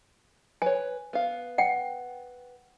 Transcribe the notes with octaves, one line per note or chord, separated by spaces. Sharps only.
B4 C#5 G#5
B3 F5
F#5 G5